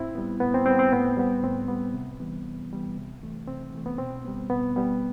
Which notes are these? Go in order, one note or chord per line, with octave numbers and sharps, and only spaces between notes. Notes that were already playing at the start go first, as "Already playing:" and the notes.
Already playing: A2 C4 E4
G3 B3
A2 B3
C4
G3 B3 C4
C4
A2 B3
G3 B3
A2 C4
G3 B3
C3
E3 G3 B3
C3
E3 G3 B3
C3
E3 A3
C3 C4
E3 A3
B3
B2 C4
G3 B3
B2 B3
G3 B3